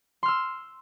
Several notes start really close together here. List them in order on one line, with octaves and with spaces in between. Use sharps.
C6 F6 E6